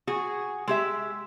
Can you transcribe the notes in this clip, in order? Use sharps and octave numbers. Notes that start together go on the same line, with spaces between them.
F#4 G#4
G#3 G4 E5